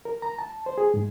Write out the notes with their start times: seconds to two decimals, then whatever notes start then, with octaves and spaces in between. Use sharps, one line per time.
0.05 A#4
0.22 A#5
0.39 A5
0.66 C5
0.78 G#4
0.94 G#2